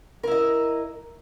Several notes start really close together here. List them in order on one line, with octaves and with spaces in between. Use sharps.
A#4 E4 D#5